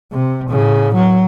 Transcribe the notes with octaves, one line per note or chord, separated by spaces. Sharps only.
C3
A2 C#3
F#3